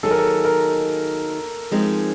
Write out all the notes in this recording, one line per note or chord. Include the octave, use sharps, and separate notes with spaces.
D#3 F#3 A#3 D#4 G#4 A4
A#4
A4
A#4
F3 G#3 C4 D#4 G#4